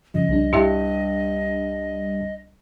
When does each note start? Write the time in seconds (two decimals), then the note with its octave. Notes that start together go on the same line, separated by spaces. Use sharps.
0.14 G2 C#3 F3 D#5
0.29 C2 G3 D4
0.53 G2 E4 G4 E5